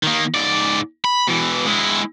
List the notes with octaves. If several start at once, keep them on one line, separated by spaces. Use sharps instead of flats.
D#3 A#3
G#2 D5
B5
B2 E3
G#3 E4